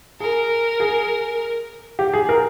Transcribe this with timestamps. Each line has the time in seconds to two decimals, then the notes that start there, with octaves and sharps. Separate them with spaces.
0.20 G#4 A#4
0.80 G#4
1.99 G4
2.13 G#4
2.29 A#4